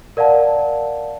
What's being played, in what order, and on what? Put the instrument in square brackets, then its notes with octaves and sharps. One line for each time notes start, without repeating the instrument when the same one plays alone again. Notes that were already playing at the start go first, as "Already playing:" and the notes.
[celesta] A#4 D5 F5 F#5 A5